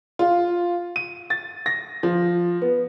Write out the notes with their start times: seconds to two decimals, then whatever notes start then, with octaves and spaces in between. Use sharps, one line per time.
0.19 F4
0.96 D#7
1.30 A6
1.66 A#6
2.03 F3
2.62 B3